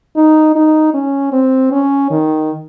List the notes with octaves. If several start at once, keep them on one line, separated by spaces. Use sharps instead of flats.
D#4
D#4
C#4
C4
C#4
D#3